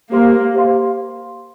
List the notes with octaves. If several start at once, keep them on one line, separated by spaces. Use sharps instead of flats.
A#3 G4 C5 F5 C6
G4 C5 F5 C6